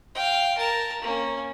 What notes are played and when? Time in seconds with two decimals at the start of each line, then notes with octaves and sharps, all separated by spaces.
0.15 F5 G5
0.58 A#4 A5
1.02 A#3 C#4